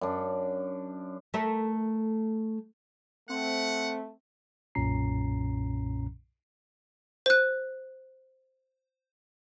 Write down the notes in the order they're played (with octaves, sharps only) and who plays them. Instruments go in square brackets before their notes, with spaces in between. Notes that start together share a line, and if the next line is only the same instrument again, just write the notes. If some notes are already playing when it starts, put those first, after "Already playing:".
[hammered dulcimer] F#2 D4
[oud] A3 A#4 E5
[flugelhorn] A3 [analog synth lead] C4 [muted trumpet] F#5
[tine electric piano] B1 F#2 A#2 C#4 A#5 C7
[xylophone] C5 F#6